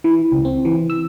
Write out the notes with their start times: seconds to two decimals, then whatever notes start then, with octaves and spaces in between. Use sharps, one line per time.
0.04 E3
0.32 C#2
0.45 C4
0.65 E3
0.90 E6